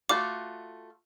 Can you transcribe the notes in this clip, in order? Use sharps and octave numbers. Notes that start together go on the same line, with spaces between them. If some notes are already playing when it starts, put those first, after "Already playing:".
A3 F4 F#4 D6